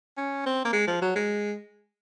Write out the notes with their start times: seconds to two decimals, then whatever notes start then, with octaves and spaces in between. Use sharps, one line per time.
0.17 C#4
0.46 C4
0.65 A#3
0.73 G#3
0.87 F3
1.02 F#3
1.15 G#3